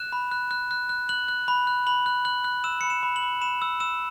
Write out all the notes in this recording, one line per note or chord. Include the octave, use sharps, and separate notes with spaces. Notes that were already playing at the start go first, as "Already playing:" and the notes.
Already playing: F#6 E7
B5
F#6
F#6
F#6
F#6
F#6 F#7
F#6
B5
F#6
B5 F#7
F#6
F#6 F#7
F#6
E6 E7
B5 C#7
E7
B5
F#7
B5
B5 E7
E6
E6 E7